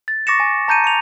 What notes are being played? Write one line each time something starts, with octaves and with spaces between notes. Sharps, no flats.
A6
C#6 D6 A6 A#6 C#7 E7
G#5
A5 A#5 G6 C#7 D#7
C#7 F7